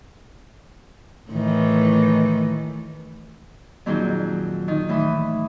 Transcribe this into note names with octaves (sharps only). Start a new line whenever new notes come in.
A2 D#3 E3
F2 A#2 D#3 F#3 G#4 G5
D#3
A2 E3 B5 D#6